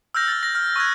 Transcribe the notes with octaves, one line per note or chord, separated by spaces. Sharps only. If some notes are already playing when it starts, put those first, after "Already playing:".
E6 F6 G6 A#6
E6 A6
A#6
F6
C#6 E6 F#6 G#6